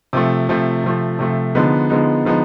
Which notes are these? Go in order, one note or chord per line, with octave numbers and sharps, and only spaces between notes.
C3 F3 A3
C3 F3 A3
C3 F3 A3
C3 F3 A3
D3 F3 G#3 B3 D#4
D3 F3 G#3 B3 D#4
D3 F3 G#3 B3 D#4